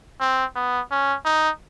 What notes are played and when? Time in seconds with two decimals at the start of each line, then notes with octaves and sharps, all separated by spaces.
0.21 C4
0.56 B3
0.91 C#4
1.25 D#4